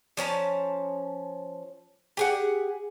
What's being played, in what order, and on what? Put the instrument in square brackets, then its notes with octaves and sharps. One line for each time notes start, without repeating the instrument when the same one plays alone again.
[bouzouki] F3 C#4 A5 A#5
G4 G#4 F#5